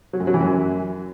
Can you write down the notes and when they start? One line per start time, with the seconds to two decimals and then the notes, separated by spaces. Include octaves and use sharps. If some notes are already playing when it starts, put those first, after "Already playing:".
0.13 F#3
0.20 F#2
0.27 F#3
0.34 E3
0.41 F#2